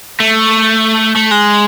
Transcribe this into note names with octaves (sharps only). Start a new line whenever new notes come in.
A3
A3
G#3